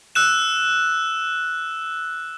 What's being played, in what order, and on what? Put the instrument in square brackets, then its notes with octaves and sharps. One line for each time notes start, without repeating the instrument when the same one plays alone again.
[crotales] E6 F#6 E7